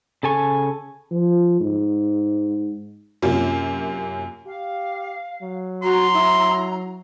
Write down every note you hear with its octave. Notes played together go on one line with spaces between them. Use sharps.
C#3 A4 G#5 C#6
F3
G#2
F#2 C3 A#3 C#4 F4
G4 F5
F#3
F#4 A#5 C6
E4